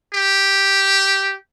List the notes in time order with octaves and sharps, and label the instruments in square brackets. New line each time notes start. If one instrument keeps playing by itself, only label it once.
[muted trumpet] G4